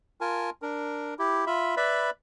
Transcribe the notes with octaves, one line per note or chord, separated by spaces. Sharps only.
F4 A#4 G#5 A5
D4 A#4
E4 G4
F4 E5 B5
B4 D5 E5 B5